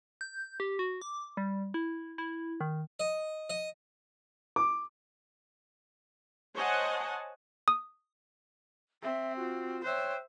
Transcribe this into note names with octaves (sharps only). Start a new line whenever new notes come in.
G6
G4
F#4
D6
G3
E4
E4
D#3
D#5
D#5
D6
C5 C#5 D#5 F#5 G#5 A5
D#6
C4 E5
F4 F#4
C5 C#5 E5 G5 F#6